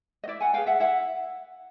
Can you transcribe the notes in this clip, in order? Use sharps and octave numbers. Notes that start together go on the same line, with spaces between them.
D#5
E4 D5 E5
F#5 G#5
G#4 B4 F5 G5
E5 F#5
E4 E5 F#5